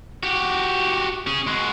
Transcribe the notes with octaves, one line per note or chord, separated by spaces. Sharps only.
F#4 G4
C#4 G#4
G#3 F#4